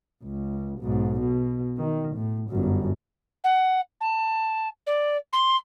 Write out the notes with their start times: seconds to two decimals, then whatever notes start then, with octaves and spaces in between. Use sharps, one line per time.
0.23 C#2
0.80 B1 G#2
1.19 B2
1.78 D#3
2.15 A2
2.50 G1 F#2
3.44 F#5
4.00 A5
4.86 D5
5.32 C6